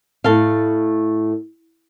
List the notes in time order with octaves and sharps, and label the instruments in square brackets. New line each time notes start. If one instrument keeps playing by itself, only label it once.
[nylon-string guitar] A2 A4 F5